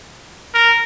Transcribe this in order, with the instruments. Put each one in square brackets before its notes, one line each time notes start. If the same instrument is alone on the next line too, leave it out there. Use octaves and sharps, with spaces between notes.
[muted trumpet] A#4